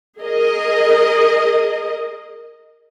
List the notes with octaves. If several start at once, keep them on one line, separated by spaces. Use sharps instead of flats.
G#4 A#4 D#5